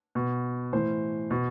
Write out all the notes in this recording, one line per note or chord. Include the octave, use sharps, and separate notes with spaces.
B2
A2 E3 C5
B2